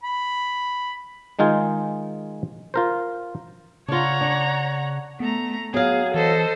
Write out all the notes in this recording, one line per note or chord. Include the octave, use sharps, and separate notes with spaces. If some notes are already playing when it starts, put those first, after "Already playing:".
B5
D#3 G#3 D#4 F4 G#4
F4 A#4 C5
C#3 D4 F4 C#5 F#5 A#5
D4
A3 B3 A#5
F#3 B3 G#4 F5
E3 A4 C5 D#5